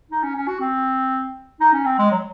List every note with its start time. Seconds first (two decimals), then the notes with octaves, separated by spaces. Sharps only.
0.11 D#4
0.23 C#4
0.35 C#4
0.48 F#4
0.60 C4
1.61 D#4
1.74 C#4
1.85 C4
1.98 G#3
2.11 F#3